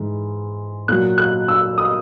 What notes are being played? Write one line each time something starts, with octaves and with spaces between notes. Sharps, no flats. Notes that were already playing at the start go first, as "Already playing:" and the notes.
Already playing: G#2 E3
A#2 F#3 F#6
F#6
E6
D#6